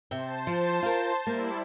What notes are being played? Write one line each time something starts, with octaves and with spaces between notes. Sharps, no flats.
C3 C5 E5 G5 A5
F3
F4 A#4
G3 A#3 E4